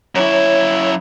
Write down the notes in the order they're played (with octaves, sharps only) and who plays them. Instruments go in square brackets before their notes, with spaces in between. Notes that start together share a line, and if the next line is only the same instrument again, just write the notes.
[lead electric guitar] F#2 E4 [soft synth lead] C#5